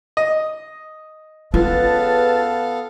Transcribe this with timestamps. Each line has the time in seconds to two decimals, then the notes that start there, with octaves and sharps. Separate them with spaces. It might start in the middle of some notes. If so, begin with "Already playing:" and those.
0.17 D#5
1.54 C#2 B3 F4 A4 B4 F5 A5